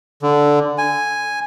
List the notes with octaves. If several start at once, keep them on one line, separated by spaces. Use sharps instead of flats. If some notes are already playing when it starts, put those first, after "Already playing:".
D3
G#5